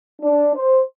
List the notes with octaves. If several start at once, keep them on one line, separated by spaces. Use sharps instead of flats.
D4
C5